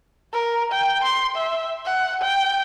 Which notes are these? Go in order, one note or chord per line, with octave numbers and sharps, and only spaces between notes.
A#4
G5
C6
E5
F#5
G5